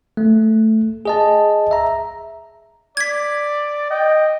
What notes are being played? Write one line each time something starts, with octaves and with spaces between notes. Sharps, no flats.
A3
G#4 D#5 A5
E5 A#5
D5 G#6 B6
D#5 G5